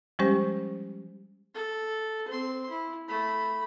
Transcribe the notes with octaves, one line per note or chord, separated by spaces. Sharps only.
F3 G3 G#3 C#4 G4 C5
A4
C4 C6
E4
A3 B5